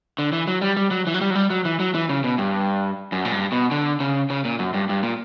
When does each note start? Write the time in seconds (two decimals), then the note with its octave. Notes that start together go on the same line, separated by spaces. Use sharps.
0.18 D3
0.33 E3
0.47 F#3
0.61 G3
0.77 G3
0.91 F#3
1.07 E3
1.14 F#3
1.21 G3
1.30 F#3
1.35 G3
1.50 F#3
1.65 E3
1.80 F#3
1.95 E3
2.09 C#3
2.24 B2
2.38 G2
3.12 F#2
3.25 A#2
3.32 G2
3.52 B2
3.71 D3
4.00 C#3
4.30 C#3
4.45 A#2
4.59 F#2
4.74 G2
4.89 G2
5.03 A#2